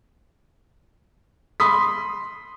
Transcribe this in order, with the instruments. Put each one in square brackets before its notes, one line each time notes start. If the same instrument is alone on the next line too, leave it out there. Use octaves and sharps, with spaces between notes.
[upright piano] B5 C6 D#6 B6